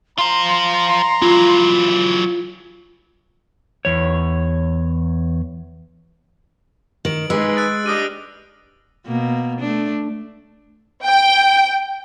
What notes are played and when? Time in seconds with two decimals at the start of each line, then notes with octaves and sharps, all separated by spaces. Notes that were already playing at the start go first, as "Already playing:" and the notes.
0.18 F4 C5 A#5 C6
1.22 E3 F#3 F4
3.85 E2 C#5
7.05 D#3 D7 F#7
7.30 G#3 D#4 G#4 B4 E6
7.57 E6 F#6 A6
7.86 D4 G4 D#5 D#6 F6 D#7
9.06 B2 A#3
9.60 A3 D4
11.05 G5